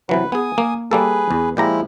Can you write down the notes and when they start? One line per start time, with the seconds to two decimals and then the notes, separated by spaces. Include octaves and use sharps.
0.09 C3 E3 F#3 B4
0.32 B3 G#4 G#5 D#6
0.58 A#3
0.91 G3 A#3 G#4 A4 B4
1.31 E2
1.57 A#2 F3 G#3 E4 G4 A#5